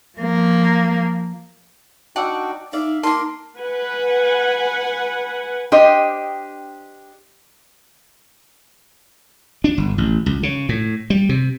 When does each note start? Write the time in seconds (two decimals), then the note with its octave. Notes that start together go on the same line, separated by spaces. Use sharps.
0.18 F3 A#3
2.16 D4 D#4 F#4 D5 F#5 G5 E6
2.73 D#4 D5 E5 F5
3.03 A#3 D#4 A#4 A5 C6
3.59 B4 F#5 G#5
5.72 D4 G4 C5 D#5
9.64 D4
9.78 G1
9.98 A1
10.26 C#2
10.43 C#3
10.69 A2
11.10 G3
11.29 C3